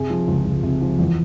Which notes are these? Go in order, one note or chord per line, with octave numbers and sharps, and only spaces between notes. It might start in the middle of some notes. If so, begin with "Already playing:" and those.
Already playing: C3 G#4
F3
C#2
C#2
C3
F3
E2